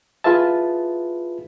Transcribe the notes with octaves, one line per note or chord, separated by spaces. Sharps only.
E4 F4 G#4 B4 E5 A5